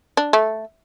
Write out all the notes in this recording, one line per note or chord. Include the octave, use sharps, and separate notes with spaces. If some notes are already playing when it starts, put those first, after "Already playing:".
D4
A3